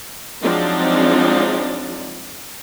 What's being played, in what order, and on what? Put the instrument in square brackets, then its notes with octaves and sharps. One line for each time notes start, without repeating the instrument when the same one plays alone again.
[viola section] F3 F#3 G#3 C4 D4 D#4